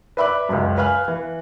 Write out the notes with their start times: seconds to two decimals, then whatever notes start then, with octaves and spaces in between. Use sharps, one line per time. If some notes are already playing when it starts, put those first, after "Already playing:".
0.17 B4 D5 E5 B5 D6 F#6
0.49 C#2 F#2
0.78 B4 F5 G#5 B5 F6 F#6
1.08 E3